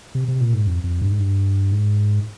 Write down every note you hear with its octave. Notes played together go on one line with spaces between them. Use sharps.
C3
C3
A#2
G#2
F2
F2
G2
G#2
G2
G#2